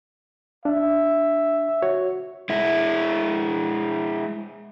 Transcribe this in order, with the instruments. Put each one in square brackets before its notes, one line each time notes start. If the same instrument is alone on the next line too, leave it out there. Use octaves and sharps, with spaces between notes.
[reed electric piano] D4 [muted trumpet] E5
[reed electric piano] F#4 C#5
[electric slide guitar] G#3 E4